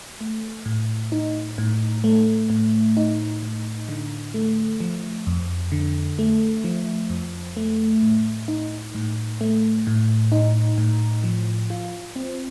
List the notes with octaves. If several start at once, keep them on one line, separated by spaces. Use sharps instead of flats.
A3
A2
D#4
A2
A3
A2
D#4
A2
D3
A3
F3
F2
D3
A3
F3
F2
A3
A2
D#4
A2
A3
A2
D#4
A2
F3
F4
C4